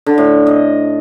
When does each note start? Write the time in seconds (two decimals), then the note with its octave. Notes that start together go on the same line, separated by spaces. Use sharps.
0.06 D3
0.18 A2
0.47 D#5